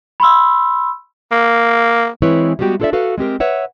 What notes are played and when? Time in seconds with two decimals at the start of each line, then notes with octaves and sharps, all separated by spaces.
0.20 B5 C6 E6
1.32 A#3
2.22 E3 G#3 C4 E4 B4 C#5
2.59 G3 G#3 B3 F#4 G4 G5
2.80 D4 F4 A4 C#5 D5 E5
2.93 F#4 A4 B4 F5
3.18 G#3 C4 G4 A#4
3.40 B4 C#5 E5 F#5